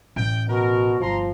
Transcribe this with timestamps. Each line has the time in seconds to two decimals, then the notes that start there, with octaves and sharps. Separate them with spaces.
0.16 A1 G5
0.48 B2 F#4 A#4
1.00 G1 G2 F3 A#5 C6